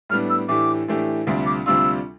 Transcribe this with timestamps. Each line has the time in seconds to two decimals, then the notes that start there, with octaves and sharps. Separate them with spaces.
0.09 A2 G3 B3 D4 F6
0.30 E6
0.48 A2 E3 A3 D4 G4 D6
0.88 A2 E3 A3 D4 G4
1.27 D2 C3 G3 D4 F4
1.46 D6
1.66 D2 C3 G3 D4 F4 E6